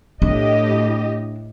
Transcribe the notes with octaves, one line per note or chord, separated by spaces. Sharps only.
A2 D4 G4 D#5